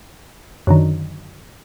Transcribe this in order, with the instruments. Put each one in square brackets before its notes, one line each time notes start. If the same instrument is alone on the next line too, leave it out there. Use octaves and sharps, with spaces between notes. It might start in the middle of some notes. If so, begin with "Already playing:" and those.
[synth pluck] F#2 D3 D#3